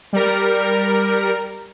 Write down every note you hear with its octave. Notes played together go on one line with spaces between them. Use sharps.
G3 A#4